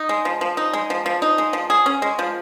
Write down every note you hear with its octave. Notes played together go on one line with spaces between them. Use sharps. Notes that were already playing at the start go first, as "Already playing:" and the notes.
Already playing: D#4
G#3
F3
F3
D#4
G#3
F3
F3
D#4
G#3
F3
G#4
C#4
G#3
F3